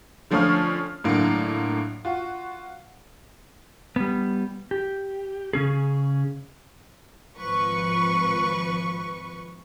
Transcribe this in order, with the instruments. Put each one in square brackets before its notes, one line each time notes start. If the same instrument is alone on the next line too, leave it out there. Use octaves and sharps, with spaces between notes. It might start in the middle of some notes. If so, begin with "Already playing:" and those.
[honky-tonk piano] D3 F3 A3 C#4 F4 F6
A2 D3 F#3 A#3
F4 F#4
[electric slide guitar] G3 B3
G4
C#3 C#4 G#4
[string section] G#1 F3 B4 C#6